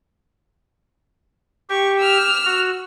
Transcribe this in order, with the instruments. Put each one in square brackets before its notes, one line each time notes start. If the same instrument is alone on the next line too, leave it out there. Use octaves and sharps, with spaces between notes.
[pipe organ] G4 [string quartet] C#6
[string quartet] E6 F6
[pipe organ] F#4